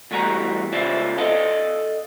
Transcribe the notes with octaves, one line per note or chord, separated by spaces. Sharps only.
E2 G3 A3 F#4 G5 A#5
C#3 F4 C5 D5 E5
A4 D5 D#5 F5 A5